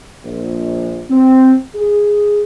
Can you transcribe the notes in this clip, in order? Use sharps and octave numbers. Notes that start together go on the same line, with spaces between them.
A#1
C4
G#4